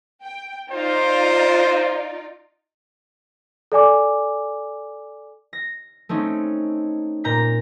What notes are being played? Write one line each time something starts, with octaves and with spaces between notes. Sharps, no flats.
G5
D#4 F4 C5 D5
A4 D5 G#5 D6
A#6
A3 C4 C#4 D#4
A#2 A#5 G6 B6